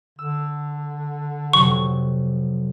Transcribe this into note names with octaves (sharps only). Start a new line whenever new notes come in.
D3 E6
F1 C3 F#3 C#6